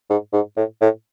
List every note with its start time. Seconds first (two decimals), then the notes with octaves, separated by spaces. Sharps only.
0.10 G#2
0.33 G#2
0.57 A2
0.81 A2